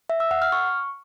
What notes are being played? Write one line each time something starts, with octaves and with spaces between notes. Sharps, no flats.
E5
E6
F#5
F6
C#6